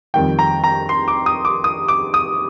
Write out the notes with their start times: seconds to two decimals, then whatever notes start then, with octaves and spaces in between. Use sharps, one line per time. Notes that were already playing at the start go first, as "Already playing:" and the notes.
0.14 F2 D#3 G3 G5
0.39 A#5
0.64 A#5
0.89 C6
1.08 D6
1.26 D#6
1.45 D6
1.64 D#6
1.88 D6
2.14 D#6